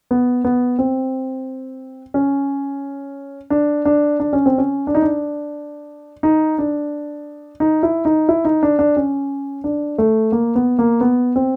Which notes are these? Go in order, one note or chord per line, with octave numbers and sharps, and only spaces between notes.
B3
B3
C4
C#4
D4
D4
D4
C#4
C4
C#4
D4
D#4
D4
D#4
D4
D#4
E4
D#4
E4
D#4
D4
D4
C#4
D4
A3
A#3
B3
A#3
B3
C4